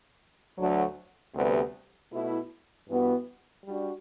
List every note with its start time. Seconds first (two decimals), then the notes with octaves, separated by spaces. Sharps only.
0.58 D2 D3 F#3
1.35 D2 C3 G3 B3
2.12 B2 A3 E4
2.88 G2 E3 B3 F#4
3.64 G3 D4 F#4